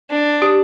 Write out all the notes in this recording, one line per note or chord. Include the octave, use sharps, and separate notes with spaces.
D4
G4